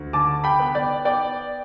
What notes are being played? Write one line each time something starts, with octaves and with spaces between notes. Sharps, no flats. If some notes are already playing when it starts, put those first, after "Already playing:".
Already playing: D2
D3 A5 D6
G5 B5
B3
D5 G5
B3 D5 G5